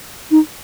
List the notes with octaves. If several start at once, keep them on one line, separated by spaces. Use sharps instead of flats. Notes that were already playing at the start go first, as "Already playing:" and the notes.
D#4